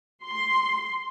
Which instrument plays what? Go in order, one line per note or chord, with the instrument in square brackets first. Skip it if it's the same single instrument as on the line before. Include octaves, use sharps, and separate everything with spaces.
[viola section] C6